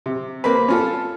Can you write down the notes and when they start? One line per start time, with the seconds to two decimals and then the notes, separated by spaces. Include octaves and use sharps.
0.06 C3
0.44 A#3 C4 B4
0.68 C#4 F4 A4